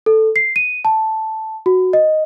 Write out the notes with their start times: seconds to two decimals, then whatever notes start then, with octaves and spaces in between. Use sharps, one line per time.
0.06 A4
0.36 C7
0.56 D#7
0.85 A5
1.66 F#4
1.93 D#5